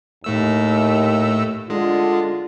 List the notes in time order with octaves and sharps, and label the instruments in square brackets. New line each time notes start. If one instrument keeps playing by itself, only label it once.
[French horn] D#2 [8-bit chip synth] A2 A3 E6
[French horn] D3 [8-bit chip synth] G#3 [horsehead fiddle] F4